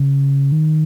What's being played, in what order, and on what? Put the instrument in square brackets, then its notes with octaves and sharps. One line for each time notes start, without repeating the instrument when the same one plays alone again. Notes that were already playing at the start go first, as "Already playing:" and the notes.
Already playing: [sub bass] C#3
D#3